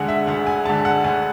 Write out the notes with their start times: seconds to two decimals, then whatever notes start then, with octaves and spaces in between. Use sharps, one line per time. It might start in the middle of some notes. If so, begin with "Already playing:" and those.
Already playing: D2 D3 G#3 F#5 G#5
0.08 E5
0.27 D2 F#5
0.47 G#5
0.65 D3 G#3 A5
0.85 F#5
1.04 D2 G#5